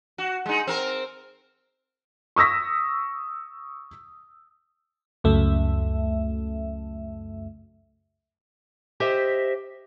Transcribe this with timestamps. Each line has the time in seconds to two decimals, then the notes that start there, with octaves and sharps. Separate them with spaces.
0.18 F#4
0.46 G#3 D#4
0.67 C4 A#4
2.36 C#6 D#6 E6 A#6 B6
5.24 C#2 F#2 A3 E5
9.00 G4 C5 D#5 E5